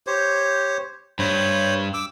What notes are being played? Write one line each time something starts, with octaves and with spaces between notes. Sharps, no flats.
G4 C5 C#5
G2 C5 C#5 B5
D6 E6